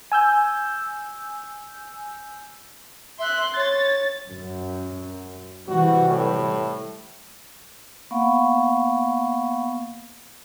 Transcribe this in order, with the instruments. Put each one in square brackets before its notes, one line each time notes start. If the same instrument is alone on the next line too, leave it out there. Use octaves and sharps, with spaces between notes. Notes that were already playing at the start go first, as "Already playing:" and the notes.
[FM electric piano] G#5 E6 G6
[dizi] E5 [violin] C6 F#6
[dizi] C#5 [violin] A6
[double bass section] F#2
[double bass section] C3 E3 G3 [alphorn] F#4
[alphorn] A2
[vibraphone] A#3 B3 F5 F#5 B5 C#6